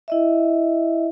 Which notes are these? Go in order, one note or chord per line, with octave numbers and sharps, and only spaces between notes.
E4 D#5 E5